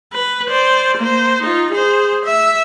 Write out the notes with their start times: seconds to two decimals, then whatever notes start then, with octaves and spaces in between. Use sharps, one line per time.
0.13 B4
0.49 C5 D5
0.97 A#3 C5
1.42 D#4 F4
1.71 G#4 C5
2.24 E5